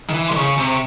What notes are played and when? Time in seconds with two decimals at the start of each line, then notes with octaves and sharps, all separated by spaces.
0.10 D#3
0.14 E3
0.28 C3 C6
0.35 C#3 C#6
0.58 C3
0.69 C#6